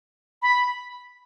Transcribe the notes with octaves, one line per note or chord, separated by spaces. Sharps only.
B5